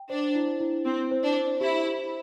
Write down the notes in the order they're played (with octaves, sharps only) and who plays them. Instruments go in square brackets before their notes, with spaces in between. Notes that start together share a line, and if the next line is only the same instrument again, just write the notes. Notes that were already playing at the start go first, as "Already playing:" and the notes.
Already playing: [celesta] G5
[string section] D4 [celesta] C5
[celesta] E4
E4
[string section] C4 [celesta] E4
[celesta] C5
[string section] D4
[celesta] C5
[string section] E4 [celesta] G4
[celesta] G4